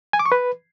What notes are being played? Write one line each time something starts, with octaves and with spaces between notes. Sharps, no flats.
G#5
D6
C#6
B4